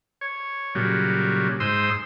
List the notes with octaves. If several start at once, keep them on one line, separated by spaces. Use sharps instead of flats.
C#5
A#2 C#3 F#3 G3
G#2 C5 C6 D#6 E6